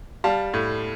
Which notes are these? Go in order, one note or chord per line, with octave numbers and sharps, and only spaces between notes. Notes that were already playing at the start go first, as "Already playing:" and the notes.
G3 F5 A5
A2